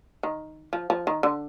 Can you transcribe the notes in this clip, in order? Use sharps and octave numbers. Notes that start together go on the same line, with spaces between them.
D#3
F3
F3
D#3
D3